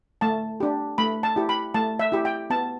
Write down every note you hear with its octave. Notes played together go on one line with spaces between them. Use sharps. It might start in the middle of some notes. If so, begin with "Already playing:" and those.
A3 A5
D4 G4
A3 B5
A5
E4 G4
B5
A3 A5
E5
E4 G4
G5
B3 A5